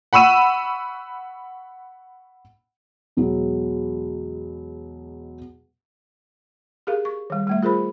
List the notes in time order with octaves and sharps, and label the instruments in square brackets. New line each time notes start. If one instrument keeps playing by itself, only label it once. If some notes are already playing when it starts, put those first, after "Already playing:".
[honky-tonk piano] F#5 B5 C#6 E6 D#7 E7
[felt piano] E2 B2 F#3 G#3
[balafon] G4 G#4 A#4 F5
C#6
D#3 G3
G3 A3 E5
F4 G#4 A#4 C5 B5